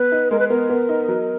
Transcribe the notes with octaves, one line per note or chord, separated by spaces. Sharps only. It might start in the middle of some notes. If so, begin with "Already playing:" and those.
Already playing: B3 B4
D#4
G#3 A#4
B4
B3 A#4
B3
D#4
F#3